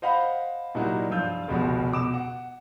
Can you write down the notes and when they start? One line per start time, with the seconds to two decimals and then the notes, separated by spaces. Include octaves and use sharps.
0.02 C5 D#5 F5 F#5 B5
0.75 A#2 F#3 G3 D#4 E4 F#4
1.10 G2 F3 F4 E6 G6
1.48 F1 C#2 B2 F3 F#4
1.92 B2 D6 E7
2.14 F#5